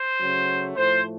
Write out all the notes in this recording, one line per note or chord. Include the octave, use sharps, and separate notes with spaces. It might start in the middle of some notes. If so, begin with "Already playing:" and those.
Already playing: C5
C#3 F#3 A3
A2 F3 A3 C5